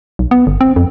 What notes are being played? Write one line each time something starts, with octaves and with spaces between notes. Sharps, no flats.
B1
B3
G1
C4
F2